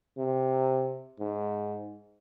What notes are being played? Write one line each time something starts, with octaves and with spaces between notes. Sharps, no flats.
C3
G#2